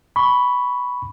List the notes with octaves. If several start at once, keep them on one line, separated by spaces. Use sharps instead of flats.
B5 C#6